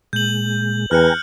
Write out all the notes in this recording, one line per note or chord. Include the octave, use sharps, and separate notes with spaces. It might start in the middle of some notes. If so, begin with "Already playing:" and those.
A#2 G#3 G6 F#7
E2 B4 G5 G#5 A#5 F6 F#6 C#7